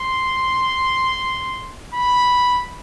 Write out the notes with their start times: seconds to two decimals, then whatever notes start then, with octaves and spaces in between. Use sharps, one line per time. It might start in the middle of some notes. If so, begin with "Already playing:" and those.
Already playing: C6
1.94 B5